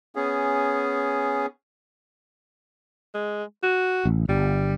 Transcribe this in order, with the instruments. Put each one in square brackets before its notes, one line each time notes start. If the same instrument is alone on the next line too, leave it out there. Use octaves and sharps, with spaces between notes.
[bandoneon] B3 C#4 G#4
[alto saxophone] G#3
F#4
[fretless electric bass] A1
[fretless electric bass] G1 [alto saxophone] G3